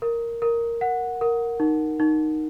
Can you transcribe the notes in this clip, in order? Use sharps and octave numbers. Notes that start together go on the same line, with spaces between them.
A#4
A#4
F#5
A#4
D#4
D#4